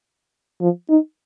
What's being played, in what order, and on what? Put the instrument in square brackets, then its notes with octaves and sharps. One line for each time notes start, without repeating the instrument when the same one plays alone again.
[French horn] F3
D#4